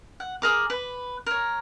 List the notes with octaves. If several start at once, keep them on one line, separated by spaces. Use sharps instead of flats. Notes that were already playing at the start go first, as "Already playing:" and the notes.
F#5
G#4 A#4 D6
B4
A#4 C#5